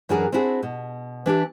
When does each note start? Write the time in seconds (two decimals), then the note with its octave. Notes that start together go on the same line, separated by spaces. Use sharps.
0.09 F#2 E3 D4 F#4 G#4 A#4
0.32 C4 D4 E4 F#4 G#4
0.63 B2
1.26 E3 D4 G4 E5